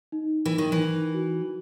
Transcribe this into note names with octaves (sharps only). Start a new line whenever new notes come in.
D#4
E3 A#4
D#3
E3
D#4
F#4